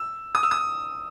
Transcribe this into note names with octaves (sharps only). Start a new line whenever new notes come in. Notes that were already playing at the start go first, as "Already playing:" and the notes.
Already playing: E6
D#6
E6
D#6